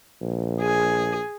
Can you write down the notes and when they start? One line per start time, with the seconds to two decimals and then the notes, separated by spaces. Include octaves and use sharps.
0.22 A#1
0.61 G#4